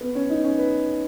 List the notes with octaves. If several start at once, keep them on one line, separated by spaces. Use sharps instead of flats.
B3
C#4
D#4
C#4
B4